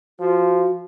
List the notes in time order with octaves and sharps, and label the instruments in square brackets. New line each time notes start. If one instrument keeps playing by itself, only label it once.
[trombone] F3 [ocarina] F#4